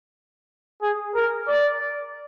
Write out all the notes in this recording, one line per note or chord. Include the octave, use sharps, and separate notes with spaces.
G#4
A#4
D5